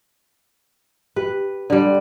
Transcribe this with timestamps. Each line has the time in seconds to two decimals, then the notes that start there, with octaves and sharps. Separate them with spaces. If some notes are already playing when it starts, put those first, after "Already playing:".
1.16 G4 B4
1.70 D3 G3